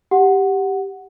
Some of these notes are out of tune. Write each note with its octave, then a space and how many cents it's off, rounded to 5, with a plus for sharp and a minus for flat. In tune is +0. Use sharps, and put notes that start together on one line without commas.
G4 +0 F#5 +0